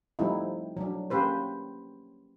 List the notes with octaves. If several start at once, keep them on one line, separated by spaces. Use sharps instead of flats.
F3 G3 A3 C4 D#4 E4
F#3 D4
A#3 C#4 G4 B4 C5